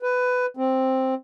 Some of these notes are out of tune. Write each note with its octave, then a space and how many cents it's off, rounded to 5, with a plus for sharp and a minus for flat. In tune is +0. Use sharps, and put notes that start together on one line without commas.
B4 +15
C4 +5